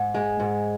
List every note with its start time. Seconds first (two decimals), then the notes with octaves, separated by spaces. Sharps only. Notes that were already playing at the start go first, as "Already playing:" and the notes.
Already playing: G#2
0.14 G#3
0.40 G#2